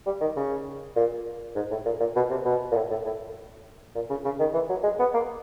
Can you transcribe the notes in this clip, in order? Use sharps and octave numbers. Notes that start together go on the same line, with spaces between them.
G3
D#3
C#3
A#2
G#2
A2
A#2
A#2
B2
C3
B2
A#2
A2
A2
A2
A#2
C#3
C#3
D#3
E3
F#3
G#3
B3
A#3